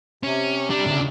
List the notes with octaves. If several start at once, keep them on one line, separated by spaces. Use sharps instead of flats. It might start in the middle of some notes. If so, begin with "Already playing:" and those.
C3 C#4
G3 D4 G4
D2 C#3